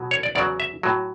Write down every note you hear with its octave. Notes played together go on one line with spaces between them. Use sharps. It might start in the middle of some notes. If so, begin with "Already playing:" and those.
Already playing: B2 F#3
C#5
D5
E2 C#3 F#3 D5
E5
A2 F#3